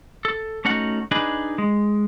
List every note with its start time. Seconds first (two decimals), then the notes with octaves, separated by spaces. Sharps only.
0.25 A4
0.65 A3 C#4 D#4 F#4 F#5
1.11 D4 D#4 G#4 B4
1.58 G#3